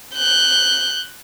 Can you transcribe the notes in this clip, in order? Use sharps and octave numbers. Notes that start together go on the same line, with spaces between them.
F#6 G6